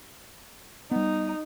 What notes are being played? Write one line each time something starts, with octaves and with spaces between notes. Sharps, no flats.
G3 B3 D#4